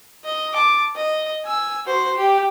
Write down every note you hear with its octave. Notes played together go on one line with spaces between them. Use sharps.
D#5
A5 D6
D#5
G#5 E6
F#4 C5
G4